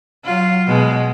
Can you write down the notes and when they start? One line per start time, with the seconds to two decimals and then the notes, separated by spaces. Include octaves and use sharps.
0.25 F#3 F4
0.67 B2 G#3